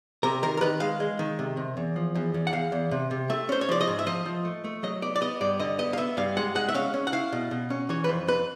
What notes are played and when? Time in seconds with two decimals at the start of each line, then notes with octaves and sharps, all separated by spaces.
0.23 C3 A#4
0.43 D#3 A#4
0.57 A#4
0.61 D#3 B4
0.80 G#3 F5
1.00 G#3
1.19 D#3
1.39 C3
1.57 C3
1.77 E2
1.96 F3
2.15 E2
2.34 E2
2.47 F#5
2.53 E2 F5
2.72 E2
2.91 C3
3.11 C3
3.30 A3 E5
3.49 C#4 C5
3.61 C#5
3.69 F3 D5
3.81 D#5
3.87 G#2
3.99 E5
4.06 F3 D#5
4.26 F3
4.45 A3
4.64 A3
4.83 F#3 D#5
5.02 B3 D5
5.16 D5
5.21 B3 D#5
5.41 G2 D5
5.59 D3 D#5
5.78 B3 D#5
5.93 F5
5.97 B3 E5
6.17 G2 F5
6.37 G#3 F#5
6.55 G#3 F#5
6.69 E5
6.74 C#4 F5
6.94 C#4
7.07 F#5
7.12 E4 F5
7.32 B2
7.51 B2
7.70 C#4
7.89 E3 C#5
8.04 B4
8.08 F2 C5
8.27 F2 B4